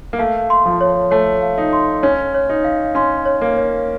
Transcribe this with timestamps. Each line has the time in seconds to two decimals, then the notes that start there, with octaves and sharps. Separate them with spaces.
0.13 A#3
0.19 A3 F5
0.50 C6
0.66 F3
0.81 C#5
1.11 A3 C#5
1.42 F5
1.58 D#4
1.73 C6
2.03 C#4 C#5
2.34 C#5
2.49 D#4
2.64 F5
2.95 C#4 C6
3.26 C#5
3.41 A#3
3.57 C#5